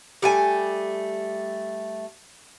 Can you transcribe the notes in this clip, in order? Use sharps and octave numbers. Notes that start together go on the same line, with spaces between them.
G3 A3 G#5